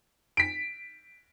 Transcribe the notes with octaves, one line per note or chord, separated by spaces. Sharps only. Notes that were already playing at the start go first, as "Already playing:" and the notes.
B6 D7